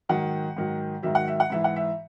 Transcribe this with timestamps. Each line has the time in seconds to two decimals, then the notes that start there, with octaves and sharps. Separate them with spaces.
0.09 G#2 D#3 F#3 F#5
0.56 G#2 D#3 F#3
1.03 G#2 D#3 F#3 E5
1.15 F#5
1.28 E5
1.40 F#5
1.50 G#2 E3 E5
1.64 F#5
1.76 E5